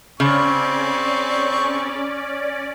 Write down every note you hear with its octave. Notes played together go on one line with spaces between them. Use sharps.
C#3 C4 C#4 D5 C#6